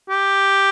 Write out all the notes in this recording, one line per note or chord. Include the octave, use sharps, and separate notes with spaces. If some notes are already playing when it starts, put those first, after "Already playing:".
G4